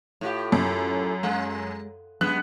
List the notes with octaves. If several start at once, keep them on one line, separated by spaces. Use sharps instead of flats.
A2 F4 G4
F#2
G#3
F#2 G#3 B3 F#6